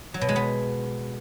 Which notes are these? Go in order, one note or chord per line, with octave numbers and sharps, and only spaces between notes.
F#3
B2
G#3
B3